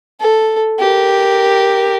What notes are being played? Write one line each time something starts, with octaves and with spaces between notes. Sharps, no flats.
A4
G4 A#4